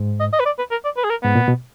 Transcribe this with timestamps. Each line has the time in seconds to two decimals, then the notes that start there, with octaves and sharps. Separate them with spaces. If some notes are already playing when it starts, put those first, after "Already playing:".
Already playing: G#2
0.20 D#5
0.33 D#5
0.40 B4
0.46 D5
0.59 B4
0.71 A#4
0.85 D5
0.97 B4
1.04 G#4
1.10 A#4
1.23 G#2 B3
1.35 A#2
1.48 B2